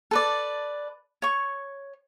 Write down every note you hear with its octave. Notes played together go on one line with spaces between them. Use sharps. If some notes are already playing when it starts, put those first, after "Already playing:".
A4 B4 D5
C#5 C#6